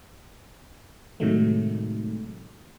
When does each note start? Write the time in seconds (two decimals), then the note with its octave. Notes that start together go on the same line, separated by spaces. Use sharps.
1.20 A2 C3 D#3 F#3 G#3 A3